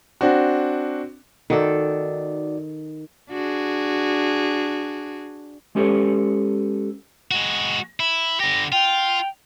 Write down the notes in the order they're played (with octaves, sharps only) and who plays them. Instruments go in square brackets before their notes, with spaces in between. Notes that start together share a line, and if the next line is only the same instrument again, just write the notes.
[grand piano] C4 D4 F#4
[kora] D#3 A4 [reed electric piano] D#4 F#4 D5
[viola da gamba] D4 F#4 G#4
[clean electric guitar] G#3 C#4 G4 A4 B4 C#5
[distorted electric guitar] G#3 F#4
E4
[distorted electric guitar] D3 G4 [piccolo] A#6
[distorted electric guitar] F4 [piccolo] G5